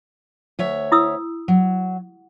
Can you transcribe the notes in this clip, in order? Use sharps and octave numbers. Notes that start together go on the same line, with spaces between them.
D2 C#5 E5
E4 D#6 E6
F#3